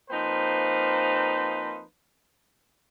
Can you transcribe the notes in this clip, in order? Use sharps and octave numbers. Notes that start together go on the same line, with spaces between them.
F3 A#3 C4 D#4 B4 C5